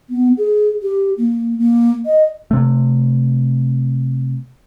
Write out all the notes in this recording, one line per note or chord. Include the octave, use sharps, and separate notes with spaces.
B3
G#4
G4
A#3
A#3
D#5
C3 A3